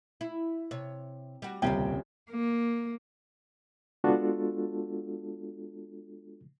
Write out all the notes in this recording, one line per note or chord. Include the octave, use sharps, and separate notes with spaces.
E4
C3 C#5
G3 F#4
D#1 C2 C#3 C4 C#4 G5
A#3
G#3 B3 D4 F4 F#4 A4